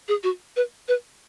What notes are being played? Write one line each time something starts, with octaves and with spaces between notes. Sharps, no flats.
G#4
F#4
B4
B4